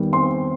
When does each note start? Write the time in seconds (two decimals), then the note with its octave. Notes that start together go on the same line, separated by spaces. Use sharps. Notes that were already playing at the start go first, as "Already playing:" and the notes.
Already playing: E2 D#3 G3
0.13 C4 C6